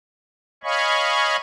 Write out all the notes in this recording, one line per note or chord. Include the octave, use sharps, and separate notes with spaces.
C#5 D#5 F5 G#5 B5 C#6